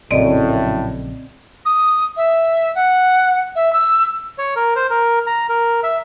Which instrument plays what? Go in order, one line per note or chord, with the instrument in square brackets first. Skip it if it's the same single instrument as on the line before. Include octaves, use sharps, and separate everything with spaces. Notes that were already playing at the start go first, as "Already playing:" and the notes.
[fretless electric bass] A#1 C#3 [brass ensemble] F#2 A2 [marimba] C4 D5 D#5
[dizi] D#6
E5
F#5
E5
E6
[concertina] C#5
A#4
C5
A#4
A#5
A#4
E5